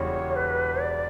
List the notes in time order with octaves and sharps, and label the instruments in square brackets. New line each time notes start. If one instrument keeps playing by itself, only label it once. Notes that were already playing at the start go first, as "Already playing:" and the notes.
Already playing: [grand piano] E1 E2 C#3 G3 [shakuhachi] C#5
[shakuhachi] B4
D5